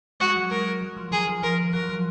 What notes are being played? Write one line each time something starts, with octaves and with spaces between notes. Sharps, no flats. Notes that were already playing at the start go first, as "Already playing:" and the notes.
G#3 F#4
F#3
G#3 A#4
F#3
F3
D#3 G#4
F3
F3 A#4
F#3 A#4
F3